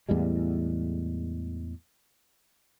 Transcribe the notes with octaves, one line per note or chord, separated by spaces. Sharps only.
E2 A2 G3 G#3